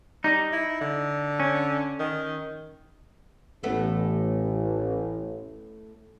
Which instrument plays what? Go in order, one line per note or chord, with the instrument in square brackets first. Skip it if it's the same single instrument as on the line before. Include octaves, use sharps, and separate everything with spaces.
[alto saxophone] G3 [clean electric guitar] D#4
[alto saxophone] E4
D3
[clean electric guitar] C#4
[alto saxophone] D#3
[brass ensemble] A1 [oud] A2 A3 B3